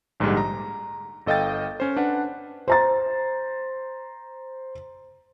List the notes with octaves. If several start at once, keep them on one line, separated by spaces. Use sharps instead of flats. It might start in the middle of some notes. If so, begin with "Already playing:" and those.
A#1 G#2 D3 G3 G#3
A#5
G1 A4 D#5 F5 G5 A6
C#4 C5
D4 B4 F#5
C5 A#5 A6